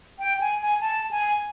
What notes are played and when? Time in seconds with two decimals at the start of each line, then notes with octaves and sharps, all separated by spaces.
0.19 G5
0.41 G#5
0.60 G#5
0.81 A5
1.11 G#5